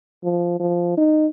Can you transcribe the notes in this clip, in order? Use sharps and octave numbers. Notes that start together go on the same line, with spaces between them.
F3
F3
D#4